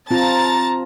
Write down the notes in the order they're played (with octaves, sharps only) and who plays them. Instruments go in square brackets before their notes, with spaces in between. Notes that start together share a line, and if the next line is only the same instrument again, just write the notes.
[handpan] C4 F4 [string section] A5 A#5 A6